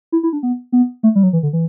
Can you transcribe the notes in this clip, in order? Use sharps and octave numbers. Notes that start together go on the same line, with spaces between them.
E4
E4
D4
B3
B3
A3
G3
F#3
E3
D3
E3